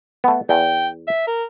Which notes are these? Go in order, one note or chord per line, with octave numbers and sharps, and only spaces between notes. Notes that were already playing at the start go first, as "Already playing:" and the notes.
A3 B3
E2 G5
E5
A#4